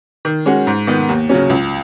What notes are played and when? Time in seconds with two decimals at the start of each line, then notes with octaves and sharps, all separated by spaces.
0.25 D#3
0.46 G#3 C#4 F#4
0.67 G#2
0.87 D#3 B3
1.09 D#2
1.29 C#3 F#3 C#4
1.50 C#2